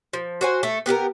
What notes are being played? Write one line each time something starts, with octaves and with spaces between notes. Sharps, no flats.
F3
F#4 C5 G#5
A3
B3 G4 G#4 A#4